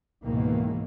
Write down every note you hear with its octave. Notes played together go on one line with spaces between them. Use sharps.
C#2 G#2 B2 D#3 E3 A#3